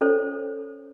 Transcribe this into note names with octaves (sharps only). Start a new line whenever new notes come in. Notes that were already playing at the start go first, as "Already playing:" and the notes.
C#4 A4 C5 C#5